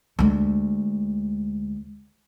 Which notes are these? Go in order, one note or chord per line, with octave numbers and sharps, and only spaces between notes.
D2 G#3